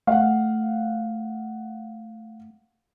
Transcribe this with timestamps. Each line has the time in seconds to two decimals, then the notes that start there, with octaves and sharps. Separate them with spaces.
0.07 A3 F5 F#5